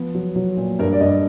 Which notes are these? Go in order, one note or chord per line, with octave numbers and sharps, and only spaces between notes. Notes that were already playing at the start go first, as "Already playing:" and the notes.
Already playing: F3 B3
F#3
F#3
A#2
G2 A#4
D5
G2 D#5